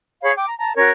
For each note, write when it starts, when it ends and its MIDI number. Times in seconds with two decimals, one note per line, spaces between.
0.22 0.32 68
0.22 0.32 73
0.22 0.32 77
0.22 0.32 83
0.36 0.45 79
0.36 0.45 86
0.48 0.55 82
0.59 0.75 81
0.59 0.75 82
0.76 0.90 61
0.76 0.90 66
0.76 0.90 70
0.76 0.90 73